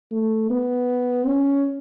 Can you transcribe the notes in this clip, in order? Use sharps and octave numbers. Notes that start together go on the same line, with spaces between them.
A3
B3
C#4